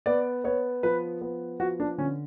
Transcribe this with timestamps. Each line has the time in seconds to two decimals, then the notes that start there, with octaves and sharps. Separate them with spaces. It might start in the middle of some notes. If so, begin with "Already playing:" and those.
0.06 B3 D5
0.44 B3 C#5
0.83 F3 B4
1.21 B3
1.60 F3 F#4
1.80 D4
1.98 D3 C#4